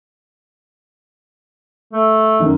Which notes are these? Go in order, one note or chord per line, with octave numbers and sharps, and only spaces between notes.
A3
F#2 D#3